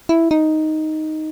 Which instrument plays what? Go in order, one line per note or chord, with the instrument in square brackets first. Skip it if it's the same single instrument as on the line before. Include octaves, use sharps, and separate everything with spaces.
[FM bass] E4
D#4